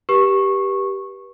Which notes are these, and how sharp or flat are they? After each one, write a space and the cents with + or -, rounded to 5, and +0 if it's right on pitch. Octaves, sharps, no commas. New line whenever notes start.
G4 +0 B4 -30 C#6 -15